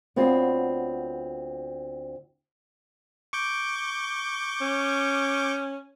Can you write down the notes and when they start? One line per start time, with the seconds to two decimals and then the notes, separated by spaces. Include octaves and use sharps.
0.16 D2 B3 C4 F4 C#5
3.33 C#6 D6 G6
4.61 C#4